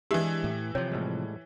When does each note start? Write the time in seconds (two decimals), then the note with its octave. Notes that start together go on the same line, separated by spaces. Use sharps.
0.11 E3 G#3 D4 E4 G4 G#4
0.44 A2
0.75 C3 F3 C#5 G5
0.92 A2 G3 G#3